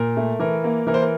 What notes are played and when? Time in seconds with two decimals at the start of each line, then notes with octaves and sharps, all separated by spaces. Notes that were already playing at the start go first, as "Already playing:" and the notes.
Already playing: A#2 A#4
0.16 A3
0.39 E3 A#4
0.64 A#3
0.87 E3 A#4
0.94 C5
1.02 A#4